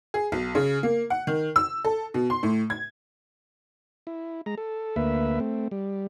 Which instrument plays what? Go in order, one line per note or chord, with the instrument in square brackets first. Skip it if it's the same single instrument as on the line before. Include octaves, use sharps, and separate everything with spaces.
[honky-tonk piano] G#4
B1
C#3
A#3
F#5
D#3
E6
A4
B2
C6
A2
G#6
[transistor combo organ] E4
G#3 A#5
A4
D2 A#3 B4 E5
A3 C4
G3